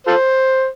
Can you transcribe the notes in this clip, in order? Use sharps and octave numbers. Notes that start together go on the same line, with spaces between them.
F4 A4 C5